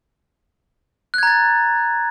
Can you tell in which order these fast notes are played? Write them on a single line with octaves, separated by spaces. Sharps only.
F#6 G#6 A#5 A6